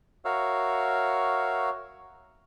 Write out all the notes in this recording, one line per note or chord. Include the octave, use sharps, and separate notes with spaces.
F#4 A#4 C#5 E5 F5